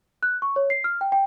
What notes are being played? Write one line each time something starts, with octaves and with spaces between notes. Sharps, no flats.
F#6
C#6
C#5
C7
F6
G5
G5